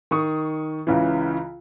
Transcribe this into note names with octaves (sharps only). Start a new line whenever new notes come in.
D#3 C#6 D#6
C#2 C#3 E3